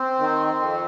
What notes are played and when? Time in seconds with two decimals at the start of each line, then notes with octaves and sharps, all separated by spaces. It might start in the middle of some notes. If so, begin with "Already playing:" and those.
Already playing: C4
0.19 D#3
0.59 F2